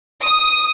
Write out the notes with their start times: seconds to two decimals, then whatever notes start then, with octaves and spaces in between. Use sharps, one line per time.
0.24 D#6